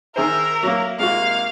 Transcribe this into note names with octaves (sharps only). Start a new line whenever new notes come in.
D#3 G#4 A#4 C5 E5
F#3 A#3
G#2 C3 G#3 A#3 F4 F#4 F5